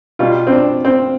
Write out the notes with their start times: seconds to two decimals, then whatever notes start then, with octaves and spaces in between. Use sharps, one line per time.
0.19 B2 G3 F4
0.47 C4
0.52 D4
0.85 C4